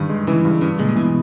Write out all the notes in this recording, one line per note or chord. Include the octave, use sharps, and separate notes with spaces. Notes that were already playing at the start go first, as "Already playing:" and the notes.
Already playing: G2 D#3
G#3
C#3 E3
G2
G2 C#3
A#2 G#3
C3
B2 E3